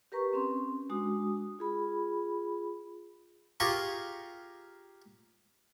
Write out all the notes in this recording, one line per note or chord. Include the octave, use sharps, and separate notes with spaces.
G4 A#4 B4 A#5 C#6
C4 C#4 C6
G#3 D4 F#4 D#6
F4 G#4 B5
F4 G4 G#4 A#4 C6 C#6